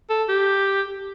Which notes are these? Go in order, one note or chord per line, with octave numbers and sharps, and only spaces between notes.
A4
G4